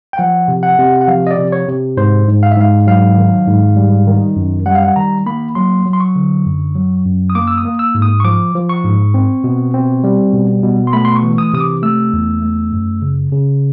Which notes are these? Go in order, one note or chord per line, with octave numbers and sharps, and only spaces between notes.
G5
F3 F#5
C3
F#5
C3
F#5
F3 F5
D#5
D5
C3
C#5
C3
G#2 C5
G#2
F5
E5
G#2 F5
F#3 F5
D#3
G#2
G3
D#3
F#2
G3 F#5
F5
F#5
D#3 A#5
A#3 B5
F#3 C6
F#3
C6
C#6
D3
F#2
F#3
F#2
D#6
A#3 D6
E6
D#6
A#3
E6
G#2
D#6
C#6
F3 D6
F3
C#6
G#2
C4
B2
C4
G3
B2
B2
C6
A3 B5
C6
C#6
E3
D#6
C3 D#6
D6
A3 E6
E2
A3
F#2
C#3
C#3